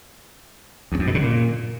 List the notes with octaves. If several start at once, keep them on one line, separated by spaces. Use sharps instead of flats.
E2
F#2
B2
C#3
A#2